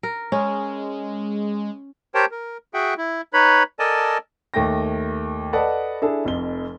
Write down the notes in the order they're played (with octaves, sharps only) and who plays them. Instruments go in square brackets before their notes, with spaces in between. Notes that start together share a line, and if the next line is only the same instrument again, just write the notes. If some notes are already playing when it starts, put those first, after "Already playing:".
[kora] A#4
[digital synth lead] G#3 [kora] C#4
[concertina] G4 A#4 C5 C#5 G5 A5
A#4
F#4 G#4 E5 F#5 G5
E4
D#4 B4 C#5 B5
A4 A#4 D5 D#5 G#5 A5
[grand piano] D#2 A3 G5 A#6
A4 B4 D5 D#5 F#5 A5
D4 E4 G#4 A4
F1 F2 G7